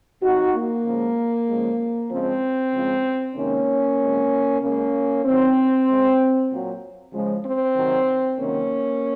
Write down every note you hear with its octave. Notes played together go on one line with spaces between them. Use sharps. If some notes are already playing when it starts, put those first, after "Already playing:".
C3 F#3 D#4 F#4
A#3
C#3 F3 G#3
C#3 F3 G#3
C#3 F3 G#3 C4
C#3 F3 G#3
C3 D#3 G#3 A#3 C#4
C3 F3 G#3
C#3 G#3 A#3 C#4
C3 D#3 F#3 C4
C#3 G#3
A#2 F#3
C#3 F3 G#3
C4
C3 D#3 F#3
C3 D#3 F#3 A#3 C#4